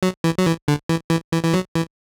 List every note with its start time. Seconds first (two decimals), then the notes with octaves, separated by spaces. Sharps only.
0.03 F#3
0.24 E3
0.38 F#3
0.46 E3
0.68 D3
0.89 E3
1.10 E3
1.32 E3
1.44 E3
1.54 F#3
1.75 E3